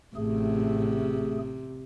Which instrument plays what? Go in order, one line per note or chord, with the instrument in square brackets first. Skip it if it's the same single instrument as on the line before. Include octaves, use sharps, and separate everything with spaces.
[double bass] A1 A2 [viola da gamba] C3 [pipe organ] A3 G#4